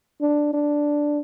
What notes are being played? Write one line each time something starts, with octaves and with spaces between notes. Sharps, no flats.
D4
D4